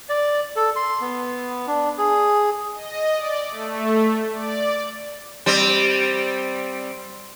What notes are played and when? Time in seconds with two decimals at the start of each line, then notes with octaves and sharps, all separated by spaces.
0.09 D5
0.56 A4
0.76 C6
1.01 B3
1.67 D4
1.98 G#4
2.74 D#5
3.13 D5
3.50 A3
4.33 D5
5.46 G3 C4